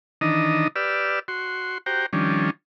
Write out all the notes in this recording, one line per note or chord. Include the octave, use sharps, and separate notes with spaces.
D#3 E3 D4 D#4 D#5
G4 B4 D5 E6 F6
F#4 C6
F#4 G4 C5 G5 A#5
D#3 F3 G3 C#4 D4